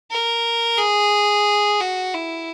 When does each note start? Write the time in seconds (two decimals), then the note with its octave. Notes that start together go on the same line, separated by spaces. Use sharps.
0.11 A#4
0.78 G#4
1.80 F#4
2.14 E4